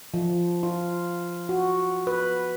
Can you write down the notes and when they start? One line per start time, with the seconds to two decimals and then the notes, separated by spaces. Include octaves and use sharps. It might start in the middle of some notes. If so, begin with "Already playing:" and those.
0.14 F3
0.63 F4
1.49 F#4
2.07 B4